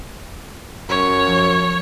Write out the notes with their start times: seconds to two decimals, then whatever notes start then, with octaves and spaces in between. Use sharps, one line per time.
0.89 F#2 C#5
1.24 F3